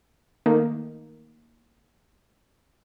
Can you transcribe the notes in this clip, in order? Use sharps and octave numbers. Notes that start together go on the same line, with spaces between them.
D#3 A3 A#3 D#4